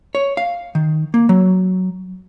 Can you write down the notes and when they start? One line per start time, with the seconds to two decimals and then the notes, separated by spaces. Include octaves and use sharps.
0.15 C#5
0.37 F5
0.75 D#3
1.14 A#3
1.29 F#3